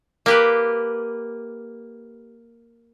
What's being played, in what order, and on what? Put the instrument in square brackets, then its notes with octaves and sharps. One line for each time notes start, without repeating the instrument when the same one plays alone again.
[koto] A#3 G4 B4